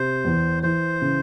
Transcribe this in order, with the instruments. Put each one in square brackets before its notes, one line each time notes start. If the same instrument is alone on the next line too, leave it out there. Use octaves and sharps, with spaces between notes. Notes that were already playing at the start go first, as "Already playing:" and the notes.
Already playing: [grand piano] C3 [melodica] C5
[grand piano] E2
[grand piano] E3 [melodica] C5
[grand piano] C#3